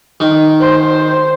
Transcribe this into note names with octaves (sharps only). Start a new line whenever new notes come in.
D#3
C5